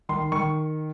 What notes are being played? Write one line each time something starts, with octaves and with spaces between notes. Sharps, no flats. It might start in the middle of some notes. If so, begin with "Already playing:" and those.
D#3 C6
D#3 C#6